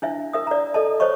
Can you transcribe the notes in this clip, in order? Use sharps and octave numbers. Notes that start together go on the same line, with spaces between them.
D4 E4 E5
A#4 E5 D#6
D5 A#5
A4 D#5 A5
C5 C#5 D#5 C#6